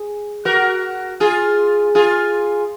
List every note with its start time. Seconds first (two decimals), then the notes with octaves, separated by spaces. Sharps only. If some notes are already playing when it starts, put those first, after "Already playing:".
Already playing: G#4
0.45 F#4 A#4
1.20 F4 G#4
1.95 F4 G#4